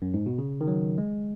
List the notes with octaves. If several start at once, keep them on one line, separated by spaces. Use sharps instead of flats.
F#2
G#2
B2
C#3
D#3
F#3
G#3